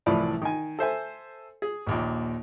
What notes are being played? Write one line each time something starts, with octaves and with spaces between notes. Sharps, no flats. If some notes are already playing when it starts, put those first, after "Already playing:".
C2 A2 E3 F3 D5 B5
D#3 G#5
A4 C5 E5 G#5
G#4
A#1 D#2 A#2